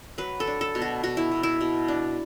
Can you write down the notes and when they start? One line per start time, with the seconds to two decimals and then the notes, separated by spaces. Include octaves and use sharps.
0.18 F#3 B4
0.40 A4
0.47 D4
0.61 A4
0.75 B2
0.82 F#4
1.03 B2 F#4
1.17 E4
1.32 B2
1.43 E4
1.61 B2
1.88 D4